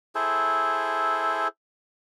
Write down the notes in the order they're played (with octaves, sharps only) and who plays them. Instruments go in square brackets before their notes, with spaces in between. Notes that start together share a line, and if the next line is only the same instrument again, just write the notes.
[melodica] E4 G#4 A4 C5